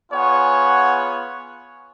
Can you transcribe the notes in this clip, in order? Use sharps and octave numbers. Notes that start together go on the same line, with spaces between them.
B3 F4 G#4 C#5 F#5 G#5